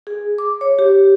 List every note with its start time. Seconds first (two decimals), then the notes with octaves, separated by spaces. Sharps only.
0.07 G#4
0.38 D6
0.61 C#5
0.79 G4